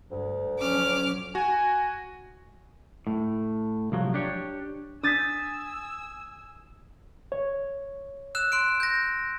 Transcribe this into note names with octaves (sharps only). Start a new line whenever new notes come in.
D2 G2
F3 F#3 C#4 D6 F6
F#4 G#5
A2
C2 F3 F#3
D4 G4 C#5
D4 G#5 D#6 E6 G6 A6 B6
C#5
E6 F#6 E7
C6 F#6 D7
G6 A#6